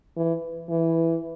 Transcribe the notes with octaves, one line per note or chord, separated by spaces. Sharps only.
E3
E3